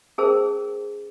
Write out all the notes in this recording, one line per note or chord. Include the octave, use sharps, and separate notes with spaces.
C#4 G#4 A#4 C5 A5 E6